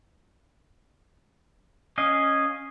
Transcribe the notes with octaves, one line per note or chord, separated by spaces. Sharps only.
C#4 D#5 F5